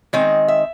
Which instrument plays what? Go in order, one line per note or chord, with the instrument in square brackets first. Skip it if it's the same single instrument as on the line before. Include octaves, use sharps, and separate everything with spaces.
[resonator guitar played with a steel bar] D#3 G#3 C4 D#5
E5